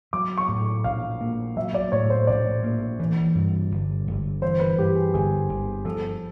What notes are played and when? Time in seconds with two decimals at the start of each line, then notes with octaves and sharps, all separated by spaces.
0.13 F#3 D6
0.37 C#6
0.49 A2
0.84 A#1 F5
1.21 A#3
1.57 F#3 E5
1.74 D5
1.92 A2 C#5
2.10 C5
2.27 A#1 D5
2.63 A#3
3.00 E3
3.35 G2
3.71 G1
4.07 G1
4.42 E3 C5
4.60 B4
4.78 G2 G4
4.96 G#4
5.14 G1 G#4
5.49 G1
5.85 F3 A4